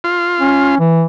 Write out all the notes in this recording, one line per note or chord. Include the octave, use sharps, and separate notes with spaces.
F4
C#4
E3